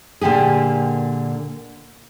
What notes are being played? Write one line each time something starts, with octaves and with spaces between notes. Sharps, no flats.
A#2 D3 A#3 G4 G#4